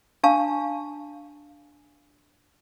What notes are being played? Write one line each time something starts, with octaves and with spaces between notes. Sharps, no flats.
D4 F5 A5 C#6